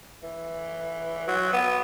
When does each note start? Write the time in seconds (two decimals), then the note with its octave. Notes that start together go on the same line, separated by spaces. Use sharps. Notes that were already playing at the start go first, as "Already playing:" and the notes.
0.23 E3
1.27 F#3
1.53 B3